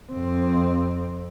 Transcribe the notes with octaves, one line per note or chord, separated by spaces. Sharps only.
F2 C4